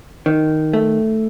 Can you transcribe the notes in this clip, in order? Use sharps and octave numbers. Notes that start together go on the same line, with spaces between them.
D#3
A3